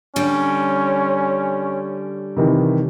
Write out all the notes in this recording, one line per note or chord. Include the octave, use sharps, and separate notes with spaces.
D3 G3 C#4
C3 D#3 E3